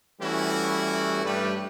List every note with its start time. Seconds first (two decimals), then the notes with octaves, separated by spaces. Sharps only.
0.20 E3 G3 A3 C#4 E4 F#4
1.25 G2 G3 A3 B4